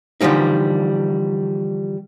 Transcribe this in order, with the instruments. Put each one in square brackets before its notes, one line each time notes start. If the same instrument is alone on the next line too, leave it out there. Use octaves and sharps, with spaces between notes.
[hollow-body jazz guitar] D3 E3 F3 G3 D#4